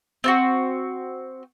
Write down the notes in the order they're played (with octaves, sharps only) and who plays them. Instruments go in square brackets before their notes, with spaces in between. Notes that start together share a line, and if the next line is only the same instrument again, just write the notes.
[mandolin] C4 F4 F#4